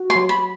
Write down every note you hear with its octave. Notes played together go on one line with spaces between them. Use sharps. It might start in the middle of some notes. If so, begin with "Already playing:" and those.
Already playing: F#4
C6
F#3
B5